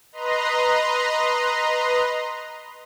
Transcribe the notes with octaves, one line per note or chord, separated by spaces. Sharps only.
B4 D#5 A#5 C6